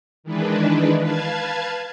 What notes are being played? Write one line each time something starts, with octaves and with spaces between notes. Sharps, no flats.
D#3 E3 G#3 D4 B4
B4 F5 A5 G#6